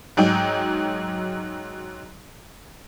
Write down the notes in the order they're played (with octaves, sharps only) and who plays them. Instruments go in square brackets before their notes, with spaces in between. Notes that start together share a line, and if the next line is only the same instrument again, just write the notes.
[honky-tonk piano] G#2 F#3 D#4 G5